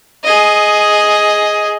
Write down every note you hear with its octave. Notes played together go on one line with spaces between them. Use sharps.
G#4 D#5